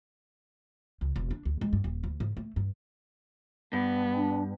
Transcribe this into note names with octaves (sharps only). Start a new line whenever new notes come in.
C#2
E1
D4
D2
G#3
G2
D#1
D2
G#2
A3
G2
G2 B3
D4